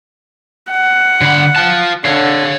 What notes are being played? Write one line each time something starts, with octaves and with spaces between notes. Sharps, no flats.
F#5
D3 B5
F4 A5
D3 C#5 F5